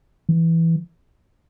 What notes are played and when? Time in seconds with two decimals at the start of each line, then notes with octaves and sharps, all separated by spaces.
0.29 E3